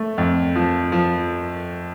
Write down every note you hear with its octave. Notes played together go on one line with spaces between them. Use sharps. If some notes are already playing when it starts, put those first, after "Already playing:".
Already playing: A3
F2
F3
F3